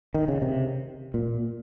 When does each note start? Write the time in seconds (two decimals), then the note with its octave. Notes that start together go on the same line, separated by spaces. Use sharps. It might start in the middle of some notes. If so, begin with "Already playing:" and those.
0.14 D#3
0.28 C#3
0.42 C3
1.14 A#2